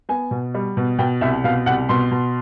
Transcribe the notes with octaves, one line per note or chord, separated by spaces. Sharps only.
B3 G#5
B2
G3
B2
B2 G5
C2 E5
B2 F5
C2 F#5
B2 C6
B2